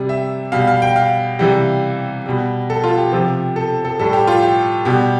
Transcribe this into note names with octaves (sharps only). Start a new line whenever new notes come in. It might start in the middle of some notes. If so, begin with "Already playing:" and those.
Already playing: C3 G3
E5
B2 G3 F5
F5
G5
F5
C3 E3 G3
B2 G3
A4
F4
G4
C3 F3
A4
A4
A2 G3 A4
G4
F4
G4
B2 G3 G4